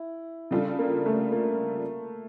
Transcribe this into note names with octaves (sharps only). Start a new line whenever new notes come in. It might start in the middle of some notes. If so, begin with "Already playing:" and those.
Already playing: E4
C#3 G3 D4 F4 A4
A#3
A3
A#3